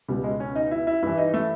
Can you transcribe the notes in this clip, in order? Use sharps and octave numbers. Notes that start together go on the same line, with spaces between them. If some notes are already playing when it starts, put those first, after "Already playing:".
C#2 B2 G3
G#3
C#4
D#4
E4
E4
G2 E3 E4
D#4
A3